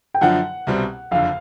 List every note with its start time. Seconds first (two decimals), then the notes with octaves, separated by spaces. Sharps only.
0.14 G5
0.21 F#2 D3 F3 F#5
0.67 C2 B2 G3 C4
1.11 F#1 F2 D3 F5